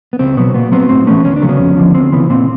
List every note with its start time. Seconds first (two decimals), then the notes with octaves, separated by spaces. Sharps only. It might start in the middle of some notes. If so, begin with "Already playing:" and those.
0.13 B3
0.19 C#2 C4
0.37 B2 F#3 B3
0.54 A#2 B3
0.72 F#3 B3 C4
0.89 A2 C4
1.07 E3 A3 B3 C#4
1.25 D2 C#4
1.36 D4
1.42 C#3 F#3 A3
1.49 B3 C#4
1.59 F2
1.77 D3 F3
1.95 D2 C4
2.12 C#3 E3 B3
2.30 A#2 C4